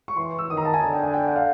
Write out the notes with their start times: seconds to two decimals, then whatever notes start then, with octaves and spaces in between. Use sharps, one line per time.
0.08 C#6
0.17 E3 C6
0.39 E6
0.50 D#3 D#6
0.57 A#5
0.65 A5
0.74 G#5
0.82 D3 A5
0.93 G5
1.03 G#5
1.14 G5
1.25 F#5
1.36 F5